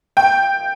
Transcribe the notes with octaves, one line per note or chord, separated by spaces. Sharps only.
G5